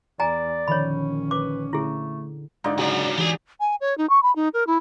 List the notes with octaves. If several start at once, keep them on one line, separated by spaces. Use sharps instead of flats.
E2 D5 G#5 A#5
A#1 D3 D#3 F3 C#4 C#5 B5
B4 D6
D3 A3 E4 G#4
G#2 D3 D#4 F4 D5
C#3 F#3 F#4 G#4 D5
C#3
E3 G4 G#5
G#5
C#5
D#4
C#6
B5
D#4
A#4
E4